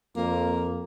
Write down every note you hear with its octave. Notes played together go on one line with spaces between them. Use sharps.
F2 A#3